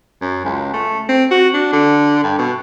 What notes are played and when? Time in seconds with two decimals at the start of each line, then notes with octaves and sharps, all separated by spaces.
0.22 F#2
0.45 C#2
0.74 A3
1.09 C4
1.31 F#4
1.54 D4
1.73 D3
2.24 G2
2.39 B2